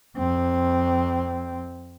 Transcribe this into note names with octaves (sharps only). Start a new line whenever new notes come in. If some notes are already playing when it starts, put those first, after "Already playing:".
F2 C4